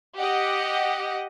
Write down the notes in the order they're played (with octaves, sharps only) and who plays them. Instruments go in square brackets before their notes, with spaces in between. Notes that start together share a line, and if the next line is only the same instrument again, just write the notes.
[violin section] G4 D#5 F#5